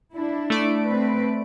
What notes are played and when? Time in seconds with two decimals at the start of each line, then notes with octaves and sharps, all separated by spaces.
0.14 D4 E4
0.50 A3 D5 D7
0.85 C4 B4